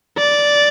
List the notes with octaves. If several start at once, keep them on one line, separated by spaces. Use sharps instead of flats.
D5